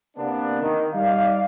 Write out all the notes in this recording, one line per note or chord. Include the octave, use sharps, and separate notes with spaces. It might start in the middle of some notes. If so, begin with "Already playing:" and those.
C3 A#3 B3 D4
D#3
G3 D#4 D5 F5